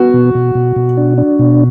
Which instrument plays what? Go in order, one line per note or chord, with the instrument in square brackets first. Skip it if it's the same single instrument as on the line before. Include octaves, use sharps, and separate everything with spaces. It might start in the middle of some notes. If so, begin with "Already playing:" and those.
Already playing: [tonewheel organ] B3 [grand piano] F#4
[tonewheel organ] B2
B2
B2
B2
D4
D4
B2